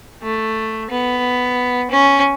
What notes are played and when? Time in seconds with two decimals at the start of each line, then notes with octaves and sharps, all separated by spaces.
0.22 A3
0.90 B3
1.91 C#4